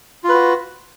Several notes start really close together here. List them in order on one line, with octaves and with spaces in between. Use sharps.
F4 B4 F#4